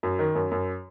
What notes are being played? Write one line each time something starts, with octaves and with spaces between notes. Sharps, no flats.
F#2
D#3
F#2
F#2